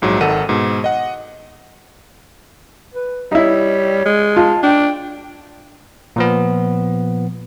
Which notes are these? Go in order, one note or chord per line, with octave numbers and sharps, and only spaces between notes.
A#1 G#2 F#3
G#1 D#3 D#4 A4 F#5 D#7
G#2 B2
D#5 F#5
B4
G3 D#4 E4 C#5
G#3
F4 A5
D4 G5
A#2 F3 B3